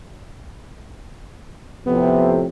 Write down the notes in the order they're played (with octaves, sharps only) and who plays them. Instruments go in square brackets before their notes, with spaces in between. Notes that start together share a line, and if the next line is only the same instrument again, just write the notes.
[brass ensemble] F2 A2 C3 [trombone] B3